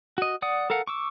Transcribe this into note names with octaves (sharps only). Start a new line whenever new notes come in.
F#4 D#5
D5 F#5 D#6
A4 A#4 F5 F#5
C#6 D6 E6